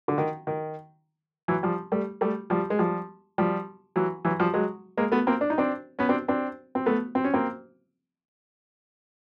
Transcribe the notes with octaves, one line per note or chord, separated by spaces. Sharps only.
D3
D#3
D#3
E3 F#3
F3 G3
G3 A3
G3 A3
F3 G3
G#3
F3 G3
F3 G3
E3 F#3
E3 F#3
F3 G3
F#3 G#3
G#3 A#3
A3 B3
A#3 C4
D4
D#4
C4 D4
B3 C#4
C4 D4
C4 D4
C4
A3 B3
C4
C#4
A#3 C4